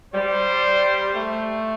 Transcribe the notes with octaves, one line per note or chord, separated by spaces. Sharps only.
G3 C5
A3